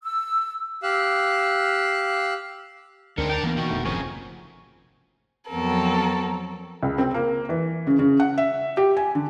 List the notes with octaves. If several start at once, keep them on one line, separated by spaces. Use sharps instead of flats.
E6
G4 F5 E6 F#6
D2 G#2 C4 D4 A#4 C#7
D5 G5 A5 A#5
B2 E3 A#3 D4 A#4
B2 D#3 G5 C#6
F1 F2 G#2 A3
G#1 C#3 F3 C4 A#4 G#5 C#6
F2 F#3 B3 C4 A4 A#4
C#2
C4
A#3
E3
C#3
C#3
F#5
E5
G4
G#5
D3